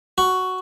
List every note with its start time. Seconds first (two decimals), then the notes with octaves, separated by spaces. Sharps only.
0.18 F#4